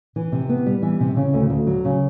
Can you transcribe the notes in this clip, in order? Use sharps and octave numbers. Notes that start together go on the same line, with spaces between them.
E3
C3
B3
G3
E3
C3
C#3
D2
D2
F#3
C#3